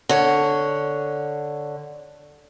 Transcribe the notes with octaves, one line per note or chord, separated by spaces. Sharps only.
D3 C#5